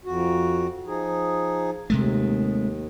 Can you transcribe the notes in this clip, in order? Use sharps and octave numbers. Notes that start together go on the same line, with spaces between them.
F2 F#4
F3 D#4 G#4
D#2 C3 G#3 A3